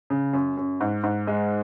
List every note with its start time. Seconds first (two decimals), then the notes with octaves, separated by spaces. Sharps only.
0.10 C#3
0.33 F#2
0.57 F#2
0.81 G#2
1.04 G#2
1.27 G#3